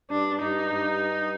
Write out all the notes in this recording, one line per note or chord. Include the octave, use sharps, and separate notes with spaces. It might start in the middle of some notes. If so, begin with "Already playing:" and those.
G2 D4
G2 D#4
G2